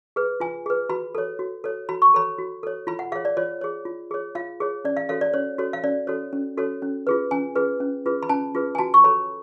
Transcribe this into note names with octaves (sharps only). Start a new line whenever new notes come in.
G#4 B4
F4 G#5
G#4 B4
F#4 B5
A4 C#5
F#4
A4 C#5
F#4 B5
C#6
A4 C#5 B5
F#4
A4 C#5
F4 B5
F#5
G#4 C#5 F5
D5
F4 C#5
G#4 C#5
F4
G#4 C#5
F4 F5
G#4 C#5
C#4 D5
F5
F#4 A4 C#5 F5
D5
C#4 C#5
F#4 A4 C#5
F5
C#4 D5
F#4 A4 C#5
C#4
F#4 A4 C#5
C#4
F4 G#4 B4
C#4 G#5
F4 G#4 B4
C#4
F4 G#4 B4
B5
C#4 A5
F4 G#4 B4
G#5
F#4 A5
C#6
A4 C#5 B5